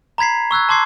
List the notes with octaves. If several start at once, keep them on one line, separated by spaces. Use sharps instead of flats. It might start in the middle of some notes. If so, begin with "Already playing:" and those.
A#5 B5 G#6 B6 C7
C#6 E6 F#6 G#6
A5 C6 D6 G#6 C7